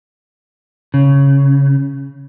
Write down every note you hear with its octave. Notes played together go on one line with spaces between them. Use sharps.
C#3